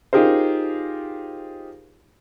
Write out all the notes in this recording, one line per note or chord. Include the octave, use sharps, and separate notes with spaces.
D#4 F4 G4 G#4 A#4 C5